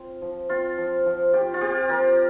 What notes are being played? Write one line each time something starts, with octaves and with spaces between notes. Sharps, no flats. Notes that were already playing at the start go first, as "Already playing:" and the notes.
Already playing: C4 F4
F3
C4 F4
F3
F3
F4 G4
F4
C4 G4
F3 A#4